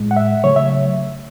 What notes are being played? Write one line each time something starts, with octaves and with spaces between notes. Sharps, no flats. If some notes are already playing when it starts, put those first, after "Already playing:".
Already playing: A2 G#3
F#5
E5
C#3 F#3 A3 C#5
E5